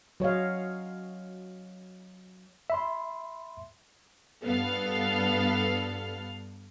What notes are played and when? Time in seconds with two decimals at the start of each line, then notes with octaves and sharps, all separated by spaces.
0.20 F#3 C#5 D#5 F5
2.70 E5 B5 C6
4.44 G2 B3 A4 F5 F6